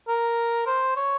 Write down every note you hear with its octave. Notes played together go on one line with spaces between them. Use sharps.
A#4
C5
C#5